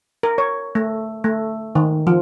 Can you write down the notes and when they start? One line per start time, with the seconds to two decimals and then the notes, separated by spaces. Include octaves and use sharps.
0.23 A#4
0.38 C#5
0.75 A3
1.24 A3
1.75 D#3
2.07 F3